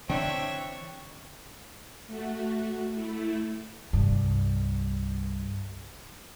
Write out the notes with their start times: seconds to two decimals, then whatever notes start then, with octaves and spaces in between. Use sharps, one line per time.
0.09 D3 E3 C4 D4 C#5 E5 G5
2.08 A3 F#4
2.91 A3 E4
3.93 C2 G2